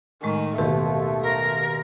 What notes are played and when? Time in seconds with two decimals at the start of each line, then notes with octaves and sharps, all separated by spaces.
0.23 A2 D#3 G#3 A3
0.58 D#2 B2 A3 G4
1.22 A#4